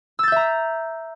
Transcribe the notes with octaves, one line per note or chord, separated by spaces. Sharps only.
E5 A#5 E6 G6 A6